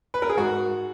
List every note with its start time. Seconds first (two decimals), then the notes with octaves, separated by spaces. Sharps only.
0.14 B4
0.22 A#4
0.30 G#4
0.37 G#2 F#4